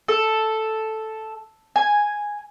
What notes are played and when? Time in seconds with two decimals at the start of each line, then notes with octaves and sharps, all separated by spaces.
0.08 A4
1.76 G#5